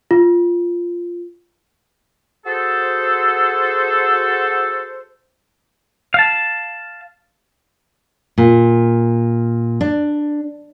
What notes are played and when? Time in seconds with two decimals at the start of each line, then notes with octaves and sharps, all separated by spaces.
0.11 F4
2.46 F#4 G#4 A4 C5
6.14 F5 A5
8.38 A#2
9.81 D4